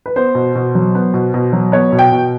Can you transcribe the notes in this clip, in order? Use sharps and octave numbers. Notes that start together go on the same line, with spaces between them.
B4
B3 C5
B2
B2
F#3
B3
B2
B2
F#3
B3 C#5
B2
G5
B2